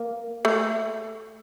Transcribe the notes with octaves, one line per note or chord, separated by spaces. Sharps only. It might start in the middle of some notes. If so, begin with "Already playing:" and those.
Already playing: A#3
A3